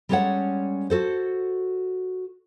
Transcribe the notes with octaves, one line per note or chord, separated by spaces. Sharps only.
G3 G#3 C#4 A4 C#5 F#5
F#4 A4 C5